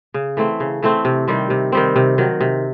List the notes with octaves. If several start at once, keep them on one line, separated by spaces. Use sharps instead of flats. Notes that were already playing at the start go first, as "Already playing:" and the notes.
C#3
E3 A3 C4
C#3
E3 A3 C4
C3
D#3 G3 C4
C3
D#3 G3 C4
C3
D#3 F#3
C3